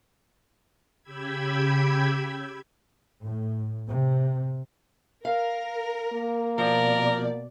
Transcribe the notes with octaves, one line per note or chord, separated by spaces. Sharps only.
C#3 G4 G5 B5 E6 G#6
A2
C3
A#4 F5
A#3
B2 F3 A#4 D5